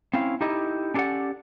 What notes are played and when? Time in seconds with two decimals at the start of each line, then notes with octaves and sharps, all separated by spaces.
0.14 C4 C#4 E4 F5
0.41 D#4 E4 G4 A4 D#5
0.94 C#4 D4 G4 A4 D5 F#5